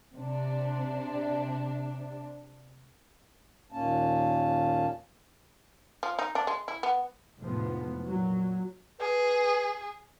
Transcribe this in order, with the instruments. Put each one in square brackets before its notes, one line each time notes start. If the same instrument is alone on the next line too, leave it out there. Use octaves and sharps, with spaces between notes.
[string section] C3 D4
[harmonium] D#2 A#2 A#3 C#4 A5
[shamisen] F3
D#4
D4
G#3
E4
B3
[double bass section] F1 A2 F3 G#3 B3
A#2 F#3
[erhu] G#4 [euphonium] B4